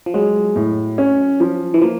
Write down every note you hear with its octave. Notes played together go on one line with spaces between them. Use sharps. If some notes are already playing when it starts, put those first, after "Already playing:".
F3
F#3 G#3
A2
C#4
F3
E3
F3 A#3